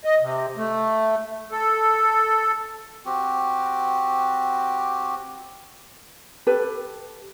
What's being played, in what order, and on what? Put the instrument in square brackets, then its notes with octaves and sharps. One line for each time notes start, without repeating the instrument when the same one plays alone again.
[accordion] D#5
C3
A3
A4
[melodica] C4 F#4 G4
[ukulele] G4 A4 B4